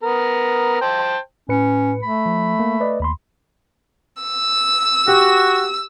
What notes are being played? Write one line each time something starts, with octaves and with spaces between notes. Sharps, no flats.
B3 A#4
C5 G5 A5
A2 C#4 B4 C#7
A3 B5
F3
A#3
B4 D5 D#5
D#2 B5 C6
E6
F#4 G4